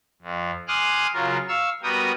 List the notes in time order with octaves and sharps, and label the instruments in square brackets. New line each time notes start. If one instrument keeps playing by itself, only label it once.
[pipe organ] F2
G#5 C6 D6 D#6 F6 F#6
C#3 F#3 F4 A#4
F5 C#6 E6
G3 B3 F#4 A#4 G5 D#6